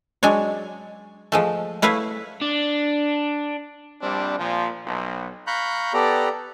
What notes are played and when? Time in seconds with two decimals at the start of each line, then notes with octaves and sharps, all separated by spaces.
0.23 F#3 G#3 D4 C#5
1.32 F3 G#3 A3
1.82 A3 E4 B4 C#5 F5
2.42 D4
4.02 A#1 G3 C4 D4
4.39 A#2 F3
4.85 B1
5.47 F5 A#5 B5 C#6 F#6 G6
5.93 B3 G4 A4 D5 A#5